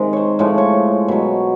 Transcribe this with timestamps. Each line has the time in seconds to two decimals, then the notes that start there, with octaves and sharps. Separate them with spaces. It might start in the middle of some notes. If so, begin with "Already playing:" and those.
Already playing: C3 D#3 G#3
0.13 C5 C#5
0.39 A2 F3 G#3 C#5
0.58 C#5
1.08 B2 F#3